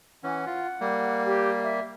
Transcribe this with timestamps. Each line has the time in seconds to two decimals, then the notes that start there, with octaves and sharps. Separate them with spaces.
0.24 E3 C#4 F#5
0.46 F4
0.80 G3 A#3
1.26 G4
1.63 E5